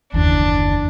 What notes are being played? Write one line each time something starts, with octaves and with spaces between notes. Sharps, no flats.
F#1 D#2 E3 D4